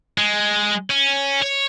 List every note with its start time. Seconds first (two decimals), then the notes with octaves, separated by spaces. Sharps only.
0.18 G#3
0.90 C#4
1.42 C#5